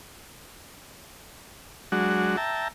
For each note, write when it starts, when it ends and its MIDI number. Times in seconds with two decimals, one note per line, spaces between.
1.92 2.37 54
1.92 2.37 56
1.92 2.37 62
1.92 2.37 66
2.37 2.68 76
2.37 2.68 79
2.37 2.68 81
2.37 2.68 82